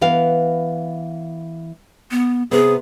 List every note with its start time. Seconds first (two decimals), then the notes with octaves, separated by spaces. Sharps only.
0.01 E3 B3 F5
2.11 B3
2.51 C3 B3 G#4